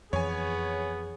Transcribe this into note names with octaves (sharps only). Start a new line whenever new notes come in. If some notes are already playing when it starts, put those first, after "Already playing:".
F2 E3 B3 G#4 C#5 G#5